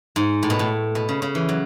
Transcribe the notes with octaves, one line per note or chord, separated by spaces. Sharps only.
G#2
A2
B2
A2
B2
C#3
C#3
E3
F#3